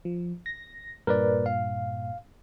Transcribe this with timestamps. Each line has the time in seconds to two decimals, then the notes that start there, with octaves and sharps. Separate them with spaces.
0.05 F3
0.46 A#6
1.07 G2 A#2 A#4 B4 D5
1.46 F5